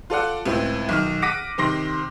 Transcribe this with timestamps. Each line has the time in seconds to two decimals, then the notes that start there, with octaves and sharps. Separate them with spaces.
0.10 F4 A4 D5 F#5
0.46 C#2 A2 C4
0.89 B1 D#3 F6
1.22 F#5 D6 A#6 B6 D7 D#7
1.58 C3 D#3 C6 A#6